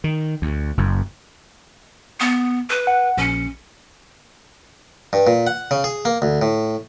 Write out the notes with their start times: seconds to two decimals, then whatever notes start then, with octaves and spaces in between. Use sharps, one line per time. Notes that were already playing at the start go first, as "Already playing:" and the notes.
0.04 D#3
0.42 D2
0.77 F#1 F#2
2.20 B3
2.70 B4
2.87 F#5
3.17 A#1 C#4 C#7
5.13 G2
5.27 A#2
5.47 F#5
5.71 C#3
5.84 G#4
6.05 A#3
6.22 D2
6.42 A2